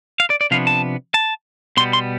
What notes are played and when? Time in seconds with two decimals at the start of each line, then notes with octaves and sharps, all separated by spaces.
0.20 F5
0.30 D5
0.41 D5
0.51 C3 F3 B3 D4 F5
0.67 A5
1.14 A5
1.77 B2 G3 B3 C6
1.93 C6